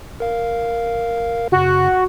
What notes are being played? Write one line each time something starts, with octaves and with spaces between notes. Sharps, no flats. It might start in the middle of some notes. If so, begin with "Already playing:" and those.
A#4 F5
F#2 C#3 F#4